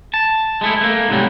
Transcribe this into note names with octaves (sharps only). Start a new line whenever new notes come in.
A5
G#3 A3 E4
A3 A#3
G#2 C3 F#3 G3